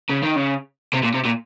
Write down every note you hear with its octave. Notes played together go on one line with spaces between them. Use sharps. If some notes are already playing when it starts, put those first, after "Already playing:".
C#3
D#3
C#3
C3
A#2
C3
A#2